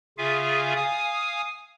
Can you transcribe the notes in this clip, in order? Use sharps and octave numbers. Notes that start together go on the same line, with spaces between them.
C#3 F4 G#4 E5 F5 G#5
F5 G#5 D#6